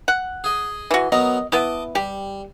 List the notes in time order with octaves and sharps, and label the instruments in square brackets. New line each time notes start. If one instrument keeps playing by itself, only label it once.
[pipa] F#5
[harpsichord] G#4 D#5
[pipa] E3 F#4
[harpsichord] F#3 B3 A#4 [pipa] D#5
[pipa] B3 E4 [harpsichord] D#5 A5 D6
[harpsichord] G3 [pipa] G4